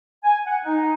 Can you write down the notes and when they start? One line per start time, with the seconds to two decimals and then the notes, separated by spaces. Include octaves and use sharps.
0.24 G#5
0.47 F#5
0.64 D#4